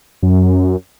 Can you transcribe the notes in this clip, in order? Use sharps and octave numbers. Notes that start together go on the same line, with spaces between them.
F#2